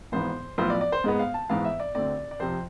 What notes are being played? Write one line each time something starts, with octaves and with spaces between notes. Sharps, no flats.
G#1 G#2 E3 B3 C5
B1 A2 F3 B3 C5
D5
D5
C5
G#2 G#3 B3
F5
A5
G#2 E3 B3 F5
E5
D5
D2 D3 A3 C4 D5
D5
F2 C3 F3 C5